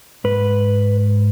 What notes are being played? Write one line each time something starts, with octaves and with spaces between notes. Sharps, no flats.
G#2 B4